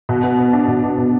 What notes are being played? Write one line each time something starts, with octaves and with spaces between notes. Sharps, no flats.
B2
B3
B3
D4
B2
D4
B2